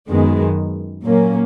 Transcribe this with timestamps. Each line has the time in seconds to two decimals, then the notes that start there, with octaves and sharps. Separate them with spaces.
0.09 F#2 D#3 G#3 B3
1.02 A#2 F#3 A#3 C#4